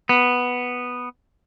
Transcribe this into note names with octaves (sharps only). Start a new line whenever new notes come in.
B3